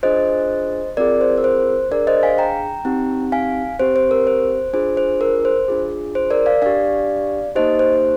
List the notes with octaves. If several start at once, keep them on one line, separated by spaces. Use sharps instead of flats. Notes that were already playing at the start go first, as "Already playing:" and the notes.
D4 F4 G#4 C5 D#5
C4 F4 G#4 A#4 D5
C5
A#4
C5
D4 G#4 A#4 D5
C5 D#5
F5 G#5
G5 A#5
C4 D#4 G4
F5 G#5
C4 G4 C5
C5
A#4
C5
D4 F4 G#4 C5
C5
A#4
C5
D4 F4 G#4
C5
A#4 D5
D5 F5
D4 G4 D5 F5
A#3 D#4 G4 C5 D#5
C5